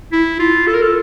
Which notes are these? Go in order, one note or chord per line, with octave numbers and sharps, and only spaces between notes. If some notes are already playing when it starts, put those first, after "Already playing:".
E4
F4
A4
A#4
A4